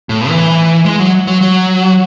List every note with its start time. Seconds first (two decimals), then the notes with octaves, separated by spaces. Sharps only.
0.09 A2
0.29 E3
0.85 G#3
0.99 F#3
1.27 F#3
1.41 F#3